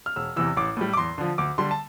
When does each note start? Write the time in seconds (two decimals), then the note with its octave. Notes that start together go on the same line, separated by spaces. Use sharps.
0.06 F6
0.16 E1 E6
0.36 E2 C3 E3 E6
0.57 A1 D6
0.77 A2 G3
0.93 D6
0.97 E2 C6
1.18 D3 F3
1.38 D2 D6
1.58 D3 G3 C6
1.71 A5